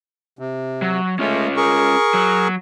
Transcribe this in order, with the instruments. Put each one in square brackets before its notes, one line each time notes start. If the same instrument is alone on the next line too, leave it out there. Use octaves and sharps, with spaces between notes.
[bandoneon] C3
[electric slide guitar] F#3
[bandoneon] G#3 A3 [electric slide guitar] C#4 F4 C#5
[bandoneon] G#4 A#4 C#6
[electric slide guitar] F#3